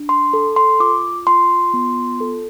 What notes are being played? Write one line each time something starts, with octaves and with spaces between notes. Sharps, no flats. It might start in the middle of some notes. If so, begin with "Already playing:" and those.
Already playing: D4
C6
A4
C6
F4 D6
F4 C6
B3
A4